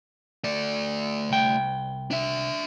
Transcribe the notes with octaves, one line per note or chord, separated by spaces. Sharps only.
A3 D5
C2 G5
D4 E5